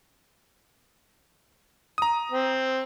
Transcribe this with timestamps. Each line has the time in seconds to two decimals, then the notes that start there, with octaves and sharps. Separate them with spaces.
1.98 A#5 D#6
2.32 C4